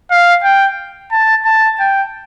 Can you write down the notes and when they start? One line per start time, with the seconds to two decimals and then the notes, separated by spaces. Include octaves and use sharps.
0.11 F5
0.44 G5
1.12 A5
1.45 A5
1.80 G5